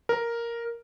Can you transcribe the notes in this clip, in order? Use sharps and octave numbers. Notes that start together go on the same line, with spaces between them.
A#4